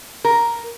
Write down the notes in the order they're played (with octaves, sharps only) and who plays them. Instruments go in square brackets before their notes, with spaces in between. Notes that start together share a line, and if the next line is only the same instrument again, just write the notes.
[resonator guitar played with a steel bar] A#4